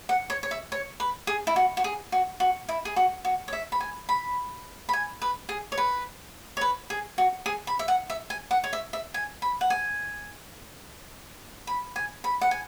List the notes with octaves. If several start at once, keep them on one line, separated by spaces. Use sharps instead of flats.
F#5
C#5
C#5
E5
C#5
B4
G#4
E4
F#4
F#4
G#4
F#4
F#4
E4
G#4
F#4
F#4
C#5
E5
B5
G#5
B5
B5
G#5
B4
G#4
C#5
B4
C#5
B4
G#4
F#4
G#4
B5
E5
F#5
E5
G#5
F#5
C#5
E5
E5
G#5
B5
F#5
G#5
B5
G#5
B5
F#5
G#5